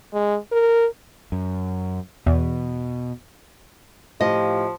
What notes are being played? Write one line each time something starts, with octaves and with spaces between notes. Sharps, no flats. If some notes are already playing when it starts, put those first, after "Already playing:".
G#3
A#4
F#2
E2 B2
A2 F3 F4 G4 D#5